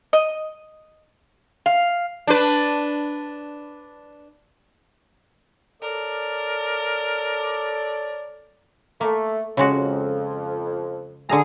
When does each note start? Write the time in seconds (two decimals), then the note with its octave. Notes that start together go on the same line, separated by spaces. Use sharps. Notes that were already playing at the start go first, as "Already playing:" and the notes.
0.13 D#5
1.66 F5
2.27 D4 B4
5.82 A4 A#4 C#5 D5
9.01 A3 A#3
9.57 F2 C#3 G#3 F#4
11.29 D3 G#4 A#5